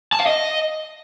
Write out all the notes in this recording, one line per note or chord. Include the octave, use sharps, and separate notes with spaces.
A5
F5
D#5